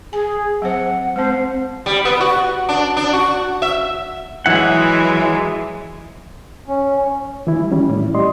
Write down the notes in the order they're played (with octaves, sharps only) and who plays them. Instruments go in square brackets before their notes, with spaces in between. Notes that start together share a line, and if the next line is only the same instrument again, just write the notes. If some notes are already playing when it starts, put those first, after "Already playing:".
[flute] G#4 [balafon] G#5
[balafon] F#3 C4 C5 [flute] F#5
[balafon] G#3 C4 [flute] C5
[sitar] G3
B3
F#4
D4
D4
F#4
E5
[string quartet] E3 G#3 [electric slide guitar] F#3 E4 F#5
[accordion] C#4
[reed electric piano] E3 E4
G3
E3 G3 C#4
A2 E4
G3 G4 D5 D#5 C6